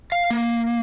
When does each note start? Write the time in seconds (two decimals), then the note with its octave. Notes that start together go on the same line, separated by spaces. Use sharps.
0.12 F5
0.31 A#3